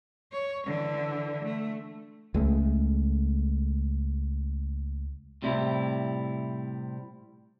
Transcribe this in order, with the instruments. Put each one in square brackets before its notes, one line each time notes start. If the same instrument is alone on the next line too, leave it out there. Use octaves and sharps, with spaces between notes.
[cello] C#5
D3 E3
A3
[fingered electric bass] C#2 G#3 A3
[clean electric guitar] A2 C3 G3 E4